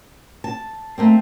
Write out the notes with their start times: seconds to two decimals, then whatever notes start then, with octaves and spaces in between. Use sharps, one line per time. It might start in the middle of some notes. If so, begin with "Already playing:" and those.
0.44 A5
0.98 A3 A#3 C4